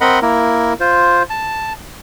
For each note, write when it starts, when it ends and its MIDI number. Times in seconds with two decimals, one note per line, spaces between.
0.01 0.20 60
0.01 0.20 70
0.01 0.20 75
0.01 0.20 78
0.01 0.20 83
0.22 0.74 58
0.22 0.74 64
0.22 0.74 70
0.80 1.23 65
0.80 1.23 72
1.30 1.73 81